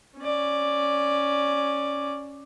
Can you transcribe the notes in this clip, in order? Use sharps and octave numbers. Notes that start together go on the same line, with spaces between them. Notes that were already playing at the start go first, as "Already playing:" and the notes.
C#4 D5